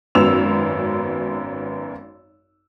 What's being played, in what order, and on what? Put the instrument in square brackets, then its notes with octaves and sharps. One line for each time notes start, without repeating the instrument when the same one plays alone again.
[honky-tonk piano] G#1 F#2 B3 E6 F7